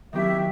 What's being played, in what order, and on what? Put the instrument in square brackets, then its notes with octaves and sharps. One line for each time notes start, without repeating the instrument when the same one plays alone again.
[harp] D#3 F#3 C4 E4 G4 [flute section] E5